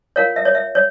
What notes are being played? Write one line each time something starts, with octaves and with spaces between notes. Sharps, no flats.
F4 A#4 C#5 F5
E5
C#5
E5
C#5